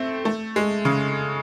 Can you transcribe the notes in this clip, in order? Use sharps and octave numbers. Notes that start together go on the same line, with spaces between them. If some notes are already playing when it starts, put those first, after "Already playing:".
Already playing: A3 C4
A3
G#3
C#3